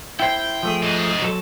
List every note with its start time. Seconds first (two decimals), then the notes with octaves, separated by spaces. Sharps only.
0.20 E4 C5 G5
0.63 F3 A3 G#4
0.83 C5 D#5
1.22 F#3 A4